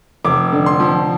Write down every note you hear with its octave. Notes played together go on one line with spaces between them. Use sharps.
F1 D6
D3
C6
F3